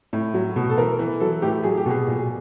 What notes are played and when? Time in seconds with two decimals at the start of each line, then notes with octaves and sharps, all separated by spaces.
0.13 A2
0.34 F#3
0.56 B2
0.70 A4
0.77 E3 A#4
0.99 E3
1.20 F#3 A4
1.42 A2 G4
1.64 F#3 G#4
1.77 G4
1.86 B2 G#4
2.07 A#2